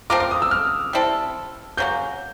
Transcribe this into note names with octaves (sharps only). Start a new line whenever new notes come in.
A3 C4 F4 A#4 D6
D6
D#6
E6
F6
G3 C4 E4 A4
C#3 F#3 A#3 G6